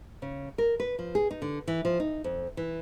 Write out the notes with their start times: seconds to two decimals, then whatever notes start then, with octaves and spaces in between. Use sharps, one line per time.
0.22 C#3
0.58 A#4
0.80 B4
0.99 F3
1.15 G#4
1.31 D#4
1.42 D3
1.68 E3
1.85 F3
2.00 D#4
2.24 F2
2.57 E3